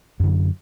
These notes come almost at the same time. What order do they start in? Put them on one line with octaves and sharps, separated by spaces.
F#2 D3 F#3